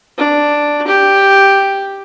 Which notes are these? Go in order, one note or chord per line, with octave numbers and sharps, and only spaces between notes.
D4
G4